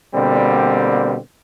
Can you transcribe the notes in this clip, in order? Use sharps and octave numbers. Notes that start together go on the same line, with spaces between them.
B2 D3 G3 A#3 C4